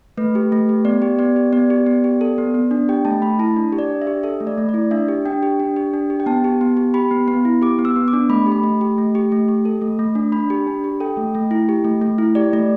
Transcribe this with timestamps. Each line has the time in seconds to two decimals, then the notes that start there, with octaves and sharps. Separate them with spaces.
0.17 A3 B4
0.35 G4
0.52 A3
0.69 G4
0.85 B3 D5
1.02 G4
1.19 B3 D5
1.36 G4
1.52 B3 D5
1.70 G4
1.86 B3
2.04 G4
2.21 A4
2.38 B3
2.54 B3
2.71 D4
2.89 G4 G5
3.05 A3 A5
3.22 A3 B5
3.39 E4 A5
3.56 D4
3.72 G4
3.79 D5
3.90 D4
4.02 E5
4.07 G4
4.23 A4 E5
4.40 A3
4.47 D5
4.58 A3
4.69 D5
4.74 E4
4.91 D4 E5
5.08 G4
5.25 D4 G5
5.43 G4
5.60 D4
5.76 G4
5.94 D4
6.10 G4
6.20 G5
6.26 B3 A5
6.44 G4
6.61 B3
6.77 G4
6.94 G4 B5
7.11 B3
7.28 B3
7.45 E4
7.62 G4 D6
7.79 B3
7.85 E6
7.96 B3
8.08 D6
8.13 D4
8.29 A3 B5
8.46 G4
8.52 B5
8.63 A3
8.81 G4
8.98 A3
9.15 G4
9.32 A3
9.48 G4
9.65 A4
9.81 A3
9.99 A3
10.15 D4
10.32 D4 B5
10.50 G4
10.67 D4
10.84 G4
11.00 A4 G5
11.17 A3
11.35 A3
11.51 E4
11.69 G4
11.84 A3
12.01 A3
12.18 E4
12.35 G4 D5
12.53 A3 D5